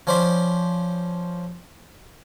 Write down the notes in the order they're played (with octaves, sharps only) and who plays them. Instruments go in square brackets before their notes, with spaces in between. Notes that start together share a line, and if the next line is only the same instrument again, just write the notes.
[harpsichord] F3 C#4 C5 D5 B5